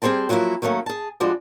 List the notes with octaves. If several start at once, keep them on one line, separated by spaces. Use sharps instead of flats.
G3 C4 G#4 C5 G5 A5
F3 F#3 A#3 C#4 E4 F#4
D#3 F#3 A3 A#3 C#4
G#4 A5
F3 G3 G#3 D4 F#4